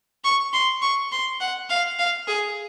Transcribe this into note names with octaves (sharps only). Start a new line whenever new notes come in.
C#6
C6
C#6
C6
F#5
F5
F5
G#4